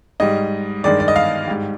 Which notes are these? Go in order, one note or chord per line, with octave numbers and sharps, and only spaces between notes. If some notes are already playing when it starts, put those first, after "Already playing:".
G#2 G3 D#5
G2 D#3 G#3 D5
D5
D#5
F5
G#2 G3